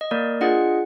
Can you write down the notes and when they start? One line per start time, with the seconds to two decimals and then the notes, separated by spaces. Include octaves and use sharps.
0.01 D#5
0.11 A#3 A#4 D5
0.41 D4 F4 G#4 D#5 F#5